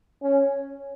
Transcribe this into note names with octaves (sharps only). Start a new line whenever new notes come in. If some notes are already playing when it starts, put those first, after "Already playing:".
C#4